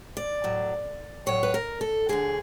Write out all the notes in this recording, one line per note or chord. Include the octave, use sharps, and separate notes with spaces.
D5
A2 F#3
A2 F#3 C#5
B4
A#4
A4
D2 D3 F#3 G#4